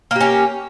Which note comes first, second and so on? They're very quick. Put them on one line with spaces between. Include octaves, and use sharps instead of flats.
A#3 G4 C#4